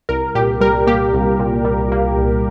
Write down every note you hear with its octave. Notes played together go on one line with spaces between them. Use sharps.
C2 A#4
A#2 G4
G3 A#4
A#3 G4
C2
A#2
G3
A#3
C2